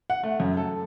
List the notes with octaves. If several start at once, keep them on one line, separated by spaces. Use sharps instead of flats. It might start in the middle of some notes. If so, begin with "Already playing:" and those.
F#5
A3
F#2
A4